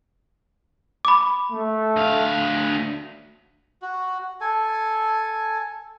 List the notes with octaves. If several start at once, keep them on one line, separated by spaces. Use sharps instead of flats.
B5 D6
A3
D2 F5
F#4
A4 G#5